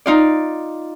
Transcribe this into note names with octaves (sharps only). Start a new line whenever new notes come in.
D#4 F4 D5